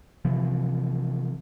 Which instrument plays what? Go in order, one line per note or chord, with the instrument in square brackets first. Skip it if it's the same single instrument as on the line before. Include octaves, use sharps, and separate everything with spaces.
[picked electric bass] C3 E3 F3 C4